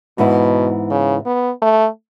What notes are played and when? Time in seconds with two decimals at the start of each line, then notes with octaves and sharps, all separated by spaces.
0.18 G#2 B2 E3 B3 E4
0.90 C#3
1.26 B3
1.62 A3